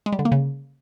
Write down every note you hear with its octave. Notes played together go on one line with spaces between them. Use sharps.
G#3
G3
D3
A#3
C#3